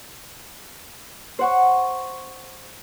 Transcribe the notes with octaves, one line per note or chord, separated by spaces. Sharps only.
C5 F#5 C#6